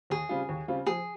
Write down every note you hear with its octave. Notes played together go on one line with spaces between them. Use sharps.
D#2 G#4
C#3 G3 C4 F4
D#2
C#3 G3 C4 F4
F3 G#4